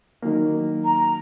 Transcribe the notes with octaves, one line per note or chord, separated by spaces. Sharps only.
D#3 F#3 A#3
A#5